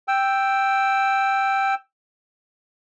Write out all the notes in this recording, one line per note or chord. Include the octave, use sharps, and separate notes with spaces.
G5 E6